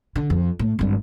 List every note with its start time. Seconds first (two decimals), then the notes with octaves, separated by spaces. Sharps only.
0.16 D3
0.30 F2
0.59 A2
0.79 G#1 G2